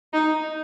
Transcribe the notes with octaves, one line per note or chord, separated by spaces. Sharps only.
D#4